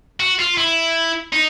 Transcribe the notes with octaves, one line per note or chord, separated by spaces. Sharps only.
F#4
F4
E4
D#4